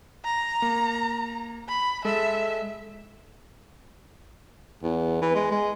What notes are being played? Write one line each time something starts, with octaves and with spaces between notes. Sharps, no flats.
A#5
A#3
B5
G#3 A4 E5
E2
E3
G#3
G#3